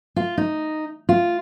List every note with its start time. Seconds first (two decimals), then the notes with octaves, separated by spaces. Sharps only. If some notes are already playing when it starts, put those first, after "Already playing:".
0.16 F4
0.38 D#4
1.09 F4